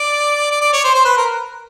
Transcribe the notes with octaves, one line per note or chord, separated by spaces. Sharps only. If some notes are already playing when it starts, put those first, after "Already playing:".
Already playing: D5
D5
D5
C#5
C5
C5
B4
A#4